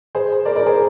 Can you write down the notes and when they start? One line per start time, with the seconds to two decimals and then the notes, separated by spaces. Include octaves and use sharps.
0.15 G#4 C5
0.45 A#4 D5
0.56 A#4 D5
0.66 G#4 C5